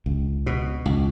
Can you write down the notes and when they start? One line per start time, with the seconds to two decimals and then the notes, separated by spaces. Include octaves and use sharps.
0.06 C#2
0.46 B2
0.86 C#2